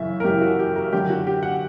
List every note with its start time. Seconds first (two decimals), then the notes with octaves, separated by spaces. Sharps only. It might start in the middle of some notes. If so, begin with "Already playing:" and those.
Already playing: F#2 C#3 E3 E5
0.20 A#4
0.24 F#2 C#3 E3 G4
0.41 F#4
0.59 G4
0.76 A#4
0.92 F#2 D3 G4
1.10 F#4
1.27 G4
1.43 F#5